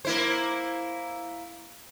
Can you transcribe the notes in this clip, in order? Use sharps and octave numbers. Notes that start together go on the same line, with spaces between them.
A#3 E4 C5